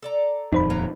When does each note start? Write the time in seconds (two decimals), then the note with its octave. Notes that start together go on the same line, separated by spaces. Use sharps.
0.02 A4 D5 A#5
0.52 D#1 F2 D#4 C5 B5
0.70 F#3 A#3 A#5